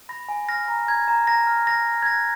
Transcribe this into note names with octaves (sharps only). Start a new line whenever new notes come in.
B5 A#6
G#5
F6 A#6
A#5
A#5 G#6
A#5
A#5 A#6
F6
F6 A#6
F6
G#6
F#6 A#6